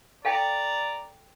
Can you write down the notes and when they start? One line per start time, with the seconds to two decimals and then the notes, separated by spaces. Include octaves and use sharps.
0.25 A4 D5 F5 G5 A#5